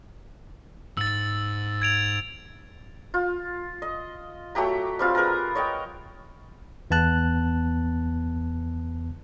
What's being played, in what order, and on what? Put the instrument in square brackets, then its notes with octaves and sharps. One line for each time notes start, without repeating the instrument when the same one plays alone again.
[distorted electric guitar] G#2 [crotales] E6 A6
[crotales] G#6 D7 F7
[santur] F4
D#5
F#3 A3 G4 A#5
G3 C4 F4
G#4 A#4 B4 A#5
C#5 D#5 F#5 G5
[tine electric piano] E2 B3 A5 F#6